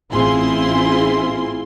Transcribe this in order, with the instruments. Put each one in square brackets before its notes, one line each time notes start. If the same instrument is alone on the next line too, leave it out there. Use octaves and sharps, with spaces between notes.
[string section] A1 C4 E4 F4 G#4 C6